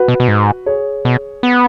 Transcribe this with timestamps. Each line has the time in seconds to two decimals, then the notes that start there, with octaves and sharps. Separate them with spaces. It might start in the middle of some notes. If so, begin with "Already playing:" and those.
Already playing: F#4 B4
0.08 B2
0.20 B2
0.28 G#2
0.66 G#4 C#5
1.05 B2
1.43 B3